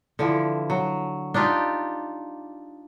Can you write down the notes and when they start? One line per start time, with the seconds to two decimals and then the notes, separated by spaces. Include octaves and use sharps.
0.19 D3 E3 F3
0.70 F#3
1.34 D4 D#4 F4 G4